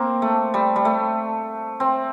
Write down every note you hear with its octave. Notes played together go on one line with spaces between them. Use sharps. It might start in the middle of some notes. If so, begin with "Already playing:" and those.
Already playing: A#3 C4
A3
G3
G3
A3
C4